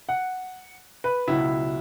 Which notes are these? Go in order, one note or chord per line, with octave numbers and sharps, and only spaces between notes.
F#5
B4
C#2 B2 F#3 E4